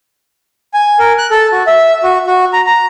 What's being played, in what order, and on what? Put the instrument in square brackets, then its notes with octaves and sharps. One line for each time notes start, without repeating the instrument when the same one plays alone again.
[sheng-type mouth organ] G#5
A#4
F#6
A4
F#4
E5
F#4
F#4
A#5
A#5